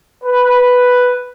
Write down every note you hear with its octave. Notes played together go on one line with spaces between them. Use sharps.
B4